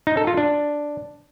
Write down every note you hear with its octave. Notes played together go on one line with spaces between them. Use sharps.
D#4
A4
F4
D4